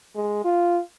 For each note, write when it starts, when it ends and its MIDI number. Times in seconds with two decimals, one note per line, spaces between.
0.15 0.41 56
0.44 0.80 65